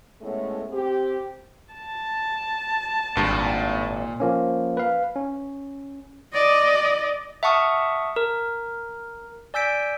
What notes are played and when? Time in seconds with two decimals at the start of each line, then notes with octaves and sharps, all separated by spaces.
0.21 A2 G#3 A3 B3 C#4
0.71 C4 G4
1.74 A5
3.17 G#1 G2 A#2
4.20 F3 A#3 C#4
4.77 B4 F5
5.16 C#4
6.33 D5 D#5
7.43 E5 F#5 A5 C#6 D#6 F6
8.16 A#4
9.54 D5 G#5 E6 G6 B6 D7